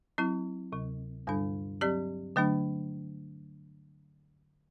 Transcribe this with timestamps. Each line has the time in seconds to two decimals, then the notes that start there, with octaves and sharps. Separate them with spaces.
0.18 F#3 C4 E4
0.72 D2 C3 F#3
1.27 G2 D3 G3 D4 A4
1.81 F#3 C4 G4 D5
2.36 D3 F#3 A3 D4